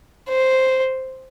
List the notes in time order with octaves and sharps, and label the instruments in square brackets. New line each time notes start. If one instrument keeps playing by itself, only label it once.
[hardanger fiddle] C5